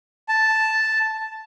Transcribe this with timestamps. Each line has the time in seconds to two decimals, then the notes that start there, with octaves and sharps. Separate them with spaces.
0.28 A5